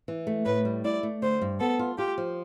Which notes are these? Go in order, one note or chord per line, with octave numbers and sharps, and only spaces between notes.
E3
A3
A2 B4
G3
E4 D5
A3
D3 C5
G2
B3 A4
F4
F4 G4
F3